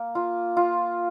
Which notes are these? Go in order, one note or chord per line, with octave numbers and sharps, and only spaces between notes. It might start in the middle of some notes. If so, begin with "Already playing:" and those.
Already playing: A#3
F4
F4